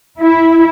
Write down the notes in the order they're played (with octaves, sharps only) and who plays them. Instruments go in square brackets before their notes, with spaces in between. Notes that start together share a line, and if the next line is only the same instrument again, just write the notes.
[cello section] E4